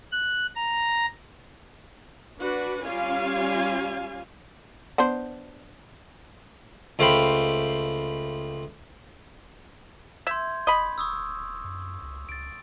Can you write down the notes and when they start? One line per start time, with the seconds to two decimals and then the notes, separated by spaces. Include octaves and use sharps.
0.11 F#6
0.55 A#5
2.39 D4 F#4 B4
2.85 G3 C#4 F4 F5 G#5
4.98 B3 D4 C5
6.99 C#2 A3 C5 F5 G5 B5
10.27 E5 C6 G6 G#6
10.67 F1 D#5 B5
10.98 D1 C#6 D#6 E6
11.64 F#2
12.03 C#2
12.29 C#2 A6 D7